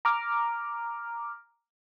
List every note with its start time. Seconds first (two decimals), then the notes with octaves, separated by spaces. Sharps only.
0.05 A#5 D6 F6